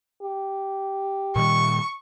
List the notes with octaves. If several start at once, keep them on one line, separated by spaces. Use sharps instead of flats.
G4
A#2 D#3 G3 C#6